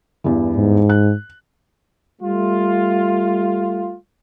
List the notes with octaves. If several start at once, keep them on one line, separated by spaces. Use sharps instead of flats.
E2 G2 E3
G#2
F#6
G3 A3 F4